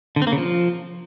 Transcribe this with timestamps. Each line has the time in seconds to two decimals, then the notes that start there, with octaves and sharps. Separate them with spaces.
0.16 D3
0.22 C4
0.27 A#3
0.32 C#3
0.38 F3